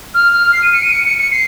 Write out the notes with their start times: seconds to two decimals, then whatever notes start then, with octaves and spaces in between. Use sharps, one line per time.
0.15 F6
0.33 F6
0.53 C7
0.63 D#7
0.73 C#7
0.83 D#7
0.92 C#7
1.06 C#7
1.19 C#7
1.32 C7